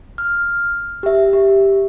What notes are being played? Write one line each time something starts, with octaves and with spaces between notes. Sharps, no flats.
F6
G4 E5
G4